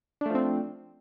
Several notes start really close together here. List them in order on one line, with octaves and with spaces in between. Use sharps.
D4 A3 F3 C4